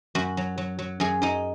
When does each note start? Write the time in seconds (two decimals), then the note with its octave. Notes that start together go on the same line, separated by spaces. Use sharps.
0.15 F#2 F#4
0.37 F#3
0.58 F#3
0.79 F#3
1.00 F#2 G#4
1.22 F#2 D#4